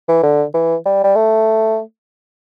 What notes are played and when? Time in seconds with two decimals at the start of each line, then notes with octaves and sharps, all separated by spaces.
0.08 E3
0.23 D3
0.54 E3
0.85 G3
1.04 G3
1.16 A3